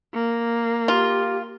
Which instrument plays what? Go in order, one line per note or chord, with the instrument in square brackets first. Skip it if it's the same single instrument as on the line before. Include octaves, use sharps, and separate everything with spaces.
[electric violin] A#3
[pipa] F4 [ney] G4